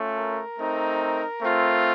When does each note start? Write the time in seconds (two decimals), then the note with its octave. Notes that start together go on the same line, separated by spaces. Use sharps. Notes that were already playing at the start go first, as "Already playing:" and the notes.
Already playing: A3 C#4 F4
0.17 A#4
0.59 A3 C4 D#4
1.42 A3 C4 F4